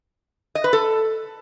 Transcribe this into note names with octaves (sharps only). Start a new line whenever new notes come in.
D#5
B4
A4